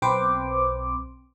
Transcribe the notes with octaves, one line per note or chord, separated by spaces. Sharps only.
B1 C4 B4 C5 D6